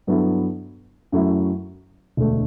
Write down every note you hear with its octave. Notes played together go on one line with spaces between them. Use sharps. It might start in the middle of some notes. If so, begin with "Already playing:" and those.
G2 F#3 B3 E4 A4
F#2 F#3 A3 E4
E1 D2 D3 A3